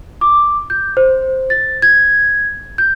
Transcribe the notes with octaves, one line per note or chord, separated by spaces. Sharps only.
D6
G6
C5
A6
G#6
G6